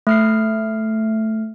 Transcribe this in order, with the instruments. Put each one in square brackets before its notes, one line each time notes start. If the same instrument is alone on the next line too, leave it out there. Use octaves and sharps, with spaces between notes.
[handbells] A3 F6 C7